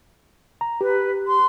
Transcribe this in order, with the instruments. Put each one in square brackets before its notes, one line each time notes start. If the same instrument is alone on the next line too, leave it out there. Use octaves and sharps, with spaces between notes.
[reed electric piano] A#5
[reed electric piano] G4 [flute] B4
[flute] C6